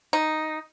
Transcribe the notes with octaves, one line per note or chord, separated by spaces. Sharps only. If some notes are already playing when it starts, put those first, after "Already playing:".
D#4